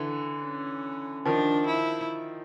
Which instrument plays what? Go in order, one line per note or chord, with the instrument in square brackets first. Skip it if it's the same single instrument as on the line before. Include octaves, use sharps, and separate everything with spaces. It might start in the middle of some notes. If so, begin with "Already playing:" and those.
Already playing: [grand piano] D3 E3
[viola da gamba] C#4
[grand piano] D#3 F3 [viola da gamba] D4
[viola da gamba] E4